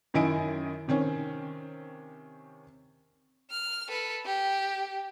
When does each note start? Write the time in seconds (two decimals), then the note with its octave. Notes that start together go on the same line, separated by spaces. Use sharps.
0.14 F#2 D#3 E4 D#5 G#5 D7
0.88 C3 D#3 C4 C#4
3.51 F6
3.89 A4 B4
4.26 G4